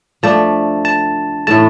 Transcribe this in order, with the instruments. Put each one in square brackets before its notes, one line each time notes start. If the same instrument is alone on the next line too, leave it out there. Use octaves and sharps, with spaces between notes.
[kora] F3 A3 D4 A4 [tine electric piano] A5
[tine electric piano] A5
[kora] A2 E3 A3 [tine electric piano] A5